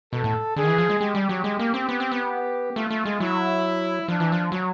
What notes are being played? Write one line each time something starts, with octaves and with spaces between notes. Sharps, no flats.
B2 A4
A2
D3 G#4
D#3
E3
F3
G#3
G#3 G4
G3
F#3
G#3
A#3
C4
B3
C4
B3
A3 F4
A3
G#3
F#3 E4
F3 D4
E3
F3
F#3